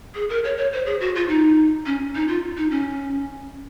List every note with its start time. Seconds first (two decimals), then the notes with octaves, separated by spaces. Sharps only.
0.15 G#4
0.29 A#4
0.44 C#5
0.57 C#5
0.73 C5
0.86 G#4
1.00 F#4
1.15 F4
1.28 D#4
1.86 C#4
2.15 D#4
2.28 F4
2.57 D#4
2.71 C#4